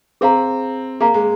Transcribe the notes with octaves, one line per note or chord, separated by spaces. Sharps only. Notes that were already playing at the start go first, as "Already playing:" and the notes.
C4 G#4 F5 A#5
A#3 G#4 F5 A#5
G#3